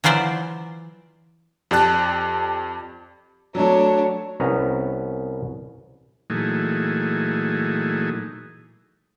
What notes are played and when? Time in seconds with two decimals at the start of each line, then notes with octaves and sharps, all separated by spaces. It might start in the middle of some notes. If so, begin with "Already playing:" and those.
0.04 E3 F#3 F4 C5 D5 E5
1.71 F2 G4 D5 A5 F#6
3.55 F#3 A3 D4 C#5
4.40 C2 B3 C#4 A#5
6.30 A#2 E3 F#3 A3 D#4 G#4